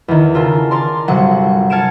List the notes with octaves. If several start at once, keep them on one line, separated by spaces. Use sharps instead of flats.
E2 D#3
C#3 F4 A4 A#4
A#4 D5 C6
G1 C3 F#3 F#5
A5 F6 G#6 C#7 D7 E7